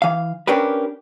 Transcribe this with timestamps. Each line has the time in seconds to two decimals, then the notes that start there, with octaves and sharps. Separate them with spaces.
0.02 E3 F5
0.47 C#4 D4 G4 A#4 B4